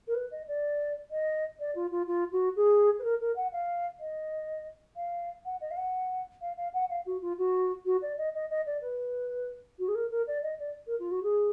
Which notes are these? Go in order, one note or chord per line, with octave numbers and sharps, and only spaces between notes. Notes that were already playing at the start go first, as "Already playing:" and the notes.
A#4
B4
D#5
D5
D#5
D5
F4
F4
F4
F#4
G#4
B4
A#4
A#4
F#5
F5
D#5
F5
F#5
D#5
F5
F#5
F5
F5
F#5
F5
F#4
F4
F#4
F#4
D5
D#5
D#5
D#5
D5
B4
F#4
G#4
A#4
A#4
D5
D#5
D5
A#4
F4
F#4
G#4